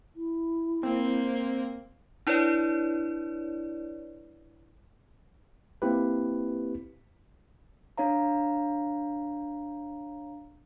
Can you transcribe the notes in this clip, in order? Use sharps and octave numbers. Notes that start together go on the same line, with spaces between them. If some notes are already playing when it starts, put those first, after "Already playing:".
E4
A#3 C4
D4 E4 B4 C#5 D5
A#3 C4 E4 G4 B4
D4 C#5 F5 A#5